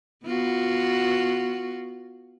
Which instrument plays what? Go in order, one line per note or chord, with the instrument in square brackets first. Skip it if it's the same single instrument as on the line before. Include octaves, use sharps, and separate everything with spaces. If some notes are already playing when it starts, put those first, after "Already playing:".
[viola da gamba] B3 F4 F#4